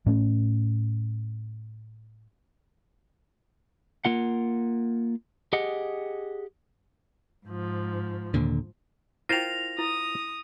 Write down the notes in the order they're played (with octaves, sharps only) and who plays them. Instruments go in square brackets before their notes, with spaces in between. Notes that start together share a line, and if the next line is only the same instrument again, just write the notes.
[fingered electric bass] A2 A3 C#4
[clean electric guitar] A#3 F4 F#5
G4 G#4 D#5 F#5
[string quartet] G#2 F3
[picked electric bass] D#2 A#2 D3
[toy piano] E4 G5 [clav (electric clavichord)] F4 A#4 C5 [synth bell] A#6 F7
[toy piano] E4 [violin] D#6